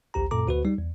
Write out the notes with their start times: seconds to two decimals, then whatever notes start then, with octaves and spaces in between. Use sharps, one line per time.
0.14 A1 D2 G4 A#5
0.31 F#2 A#2 A4 A#5 D6
0.47 D2 F#4 B4
0.65 G3 D#4
0.78 E2